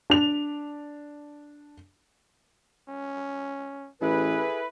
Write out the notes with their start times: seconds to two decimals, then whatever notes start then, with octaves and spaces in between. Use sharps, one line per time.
0.10 D4 F7
2.88 C#4
4.01 A1 E4 G#4 A4 B4